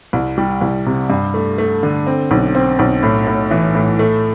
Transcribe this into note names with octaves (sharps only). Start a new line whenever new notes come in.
C2
G3
C2
C3
G2
A3
A3
D3
C4
B1
C4
B1
A2
A2
E3
A2
A3